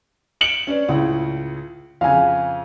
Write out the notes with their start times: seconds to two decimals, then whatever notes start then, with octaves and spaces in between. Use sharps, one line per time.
0.41 C#7 D7 F#7
0.67 C#4 D4 B4
0.88 C#2 A2 C#3
2.01 F2 C#3 F5 G#5